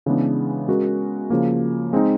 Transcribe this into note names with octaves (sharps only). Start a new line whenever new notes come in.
C#3 E3 G#3 B3 D4
G#3 C#4 F#4 A#4
C#3 F3 A#3
G#3 C4 D#4